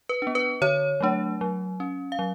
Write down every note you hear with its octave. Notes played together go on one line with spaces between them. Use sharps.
B4
B3 D4
B4
D3 C#5
F#3 A3 D4
F#3
C#4
F5
F#3